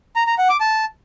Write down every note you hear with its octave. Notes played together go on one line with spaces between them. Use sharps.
A#5
A#5
F#5
D6
A5